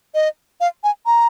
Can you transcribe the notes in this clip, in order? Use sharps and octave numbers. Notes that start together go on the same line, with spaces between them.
D#5
F5
G#5
A#5